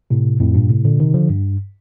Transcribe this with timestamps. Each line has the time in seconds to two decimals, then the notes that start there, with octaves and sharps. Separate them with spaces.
0.10 A2 C3
0.40 F2 A2
0.55 G2 A#2
0.70 A2 C3
0.85 A#2 D3
1.00 C3 D#3
1.14 D3 F3
1.30 G2